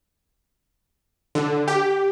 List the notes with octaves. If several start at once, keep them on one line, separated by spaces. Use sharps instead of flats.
D3
G4